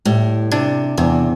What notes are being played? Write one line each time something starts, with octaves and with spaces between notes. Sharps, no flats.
A2 G3
C3 D4
E2 C3